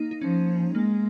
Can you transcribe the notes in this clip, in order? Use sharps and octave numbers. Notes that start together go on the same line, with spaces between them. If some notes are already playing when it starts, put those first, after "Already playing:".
Already playing: A#3 D#4
D#4
F3 C#4
G#3 A#3